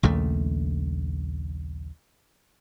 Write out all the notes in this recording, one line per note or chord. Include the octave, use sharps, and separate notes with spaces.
A#1 D#2 C#3 A3